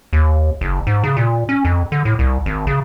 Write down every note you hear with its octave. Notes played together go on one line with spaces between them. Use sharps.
D#2
F#1
G#2
C#3
A#2
C#4
F2
D3
A2
C2
G#1
C#3